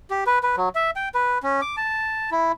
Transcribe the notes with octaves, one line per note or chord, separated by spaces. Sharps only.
G4
B4
B4
F#3
E5
G5
B4
C#4
D6
A5
E4